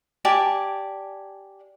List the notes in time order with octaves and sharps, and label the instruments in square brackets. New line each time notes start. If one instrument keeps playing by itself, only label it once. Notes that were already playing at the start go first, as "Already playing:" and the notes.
[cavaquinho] G4 D5 G#5 A5